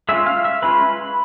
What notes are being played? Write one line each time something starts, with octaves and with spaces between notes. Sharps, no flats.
G#3 C#4 F4 E5 E6
F5 F6
E5 E6
G#3 C#4 F4 B4 B5